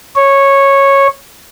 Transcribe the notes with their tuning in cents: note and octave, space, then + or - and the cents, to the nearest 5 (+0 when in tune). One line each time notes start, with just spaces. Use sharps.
C#5 -10